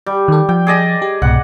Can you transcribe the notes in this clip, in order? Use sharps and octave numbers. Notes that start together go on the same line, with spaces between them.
G3
D#3 A4
F3 G5
G#4 D5 D#5
G4
C2 G#2 B2 F#5